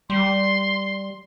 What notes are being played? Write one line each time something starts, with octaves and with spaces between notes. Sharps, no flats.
G3 C6